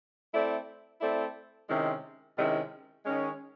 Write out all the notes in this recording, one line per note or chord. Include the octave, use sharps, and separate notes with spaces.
A3 C4 E4 A4 D5
A3 C4 E4 A4 D5
C3 D#3 G#3 C#4 E4
C3 D#3 G#3 C#4 E4
D#3 G#3 C#4